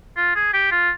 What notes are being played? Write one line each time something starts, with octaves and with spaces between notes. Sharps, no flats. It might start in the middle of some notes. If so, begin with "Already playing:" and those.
F4
G#4
G4
F4